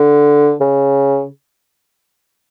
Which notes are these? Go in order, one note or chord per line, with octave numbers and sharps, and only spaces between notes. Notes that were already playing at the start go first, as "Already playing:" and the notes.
Already playing: D3
C#3